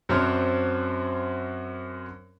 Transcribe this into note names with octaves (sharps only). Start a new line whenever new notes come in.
F#2 F#3 C4 D4 C5 F6